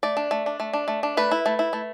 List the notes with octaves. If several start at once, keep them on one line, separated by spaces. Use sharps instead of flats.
A3 D5
D4
A3
D4
A3
D4
A3
D4
A3 B4
E4
A3
E4
A3